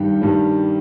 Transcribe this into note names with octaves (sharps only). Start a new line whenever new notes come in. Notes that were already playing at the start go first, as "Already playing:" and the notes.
Already playing: G2 D#3 G3 G4 G5
G2 D#3 G3